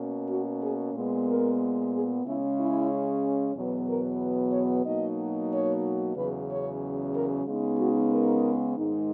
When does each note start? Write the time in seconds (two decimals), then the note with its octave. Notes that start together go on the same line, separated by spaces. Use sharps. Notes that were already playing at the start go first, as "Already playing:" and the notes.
Already playing: B2 A#3 C#4
0.29 F#4
0.61 G#4
0.94 A#2 G#3 B3
1.27 A#4
1.93 G#4
2.24 C#3 G#3 C#4 E4
2.57 E4
3.55 E2 B2 F#3 B3
3.88 A#4
4.52 C#5
4.85 B2 F#3 A#3 D#4 D#5
5.51 C#5
6.15 E2 C#3 F#3 C#4 B4
6.48 C#5
7.13 A#4
7.45 C#3 G#3 B3 D#4
7.79 F#4
8.11 A#4
8.77 G#2 D#3 G#3 D#4